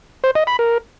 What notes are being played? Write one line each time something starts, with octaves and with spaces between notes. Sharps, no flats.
C5
D#5
B5
A#4